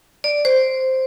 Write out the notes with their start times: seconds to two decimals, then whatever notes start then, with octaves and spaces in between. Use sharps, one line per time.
0.24 D5
0.45 C5